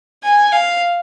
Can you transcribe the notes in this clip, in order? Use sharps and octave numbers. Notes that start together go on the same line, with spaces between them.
G#5
F5